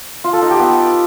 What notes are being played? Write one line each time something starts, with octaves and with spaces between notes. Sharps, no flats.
F4
A4
D#4
G4
B3